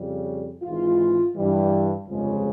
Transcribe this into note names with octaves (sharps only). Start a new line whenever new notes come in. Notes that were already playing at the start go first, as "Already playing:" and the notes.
Already playing: F2 C#3 G3
G#1 G#2 E3 G#3 F4
G2 E3 G3
G1 F2 C#3 F3 G#3